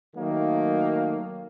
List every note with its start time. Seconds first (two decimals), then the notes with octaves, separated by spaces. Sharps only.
0.16 D#3 F#3 A3 A#3